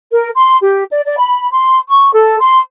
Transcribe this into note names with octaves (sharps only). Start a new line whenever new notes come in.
A#4
C6
G4
D5
D5
B5
C6
C#6
A4
C6